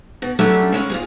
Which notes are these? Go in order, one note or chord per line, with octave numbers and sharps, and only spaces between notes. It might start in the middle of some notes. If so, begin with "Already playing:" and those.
B2
F#3 G3 A3 C#4 D4
C#3 G#3 C#4
F4 F#4 G#4